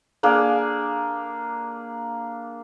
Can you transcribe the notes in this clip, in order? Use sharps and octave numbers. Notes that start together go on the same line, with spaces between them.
A#3 D4 G#4